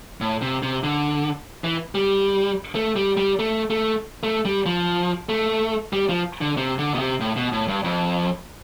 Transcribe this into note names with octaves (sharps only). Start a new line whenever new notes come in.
A2
C3
C3
D3
E3
G3
A3
G3
G3
A3
A3
A3
G3
F3
A3
G3
F3
D3
C3
D3
B2
C3
A2
B2
A2
G2
F2